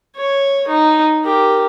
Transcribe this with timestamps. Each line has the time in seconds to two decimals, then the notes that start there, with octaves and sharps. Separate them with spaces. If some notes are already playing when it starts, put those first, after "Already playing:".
0.16 C#5
0.68 D#4
1.24 G4 A#4